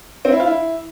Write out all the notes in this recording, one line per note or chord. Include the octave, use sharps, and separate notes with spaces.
C4
E4
F4
E4